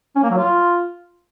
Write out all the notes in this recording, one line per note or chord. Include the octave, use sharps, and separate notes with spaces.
C#4
A#3
F#3
F4